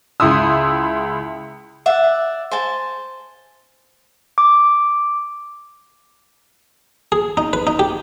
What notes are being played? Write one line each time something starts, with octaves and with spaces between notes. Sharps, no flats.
C#2 E4 C6 D#6 E6
D5 E5 F#5
C5 G#5 A5
D6
G#4
D#4
B4
D#4
G4